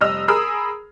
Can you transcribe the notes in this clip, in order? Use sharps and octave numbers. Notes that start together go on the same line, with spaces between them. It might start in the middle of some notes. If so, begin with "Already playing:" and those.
F1 G3 D#5 E6 F7
G#4 A#4 B5 D#6 E6